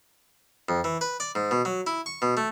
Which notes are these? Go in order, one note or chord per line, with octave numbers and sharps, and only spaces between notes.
F2
E3
B4
D5
G#2
B2
F#3
E4
C#6
B2
A3